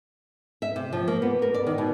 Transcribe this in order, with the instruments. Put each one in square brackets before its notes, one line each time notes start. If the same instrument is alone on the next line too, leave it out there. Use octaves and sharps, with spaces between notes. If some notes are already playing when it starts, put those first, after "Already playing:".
[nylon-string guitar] E5
C3
F3
A#3
B3
A#4
D5
D#3
B2